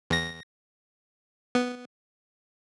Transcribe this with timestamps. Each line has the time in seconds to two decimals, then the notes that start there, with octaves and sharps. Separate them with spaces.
0.10 E2 A#6
1.55 B3